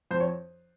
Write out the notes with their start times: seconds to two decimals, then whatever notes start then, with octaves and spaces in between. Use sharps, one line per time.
0.11 F2 C5
0.20 C#5